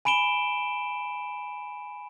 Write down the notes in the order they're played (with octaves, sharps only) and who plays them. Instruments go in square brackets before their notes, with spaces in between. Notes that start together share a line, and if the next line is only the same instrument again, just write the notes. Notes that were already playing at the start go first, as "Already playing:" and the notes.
[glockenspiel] G#5 B5 D7 E7 G7